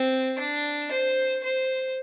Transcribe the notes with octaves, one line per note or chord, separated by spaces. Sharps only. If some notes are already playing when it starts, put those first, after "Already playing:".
Already playing: C4
D4
C5
C5